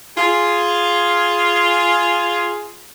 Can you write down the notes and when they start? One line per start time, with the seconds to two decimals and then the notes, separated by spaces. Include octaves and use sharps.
0.18 F4 G#4